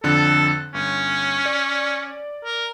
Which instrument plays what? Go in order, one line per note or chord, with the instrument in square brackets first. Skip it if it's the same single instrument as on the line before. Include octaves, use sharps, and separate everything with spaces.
[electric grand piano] F2 D3 F#6 [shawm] A4
[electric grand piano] G1 [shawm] C#4
[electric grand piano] D5
[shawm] A#4